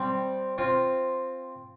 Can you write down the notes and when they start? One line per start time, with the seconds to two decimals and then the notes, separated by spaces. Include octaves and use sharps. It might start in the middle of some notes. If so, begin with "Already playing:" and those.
Already playing: G3 C4
0.58 C4 F4